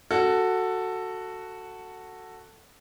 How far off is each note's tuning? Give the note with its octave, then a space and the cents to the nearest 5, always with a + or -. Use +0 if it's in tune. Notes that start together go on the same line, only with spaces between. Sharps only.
F#4 +0 A4 +10